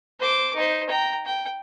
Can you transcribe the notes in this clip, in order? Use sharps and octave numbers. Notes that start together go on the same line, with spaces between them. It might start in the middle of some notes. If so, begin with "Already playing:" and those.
C5 D6
D#4 C5
G5 A#5
G5